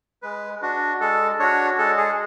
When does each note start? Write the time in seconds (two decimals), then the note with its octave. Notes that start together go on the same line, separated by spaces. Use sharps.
0.23 G#3 B4
0.62 D4 F#4
1.00 G#3 A4
1.39 D4 F#4 C#5
1.78 G#3 A4
1.97 G#4